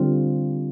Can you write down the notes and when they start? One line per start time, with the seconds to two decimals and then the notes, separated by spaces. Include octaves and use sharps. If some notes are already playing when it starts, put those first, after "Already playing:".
Already playing: D3 G3 C4 F4